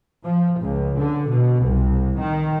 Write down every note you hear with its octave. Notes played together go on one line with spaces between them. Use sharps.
F3
C#2
D3
B2
C2
D#3